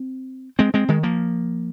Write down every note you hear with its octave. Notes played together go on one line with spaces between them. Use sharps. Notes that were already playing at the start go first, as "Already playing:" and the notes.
Already playing: C4
G#3 C4
G#3 C4
D#3 G#3
F3 A#3